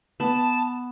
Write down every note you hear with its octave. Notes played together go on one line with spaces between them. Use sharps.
B3 A5